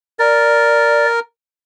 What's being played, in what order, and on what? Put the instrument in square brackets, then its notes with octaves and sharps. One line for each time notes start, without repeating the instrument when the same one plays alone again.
[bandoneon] A#4 [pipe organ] D5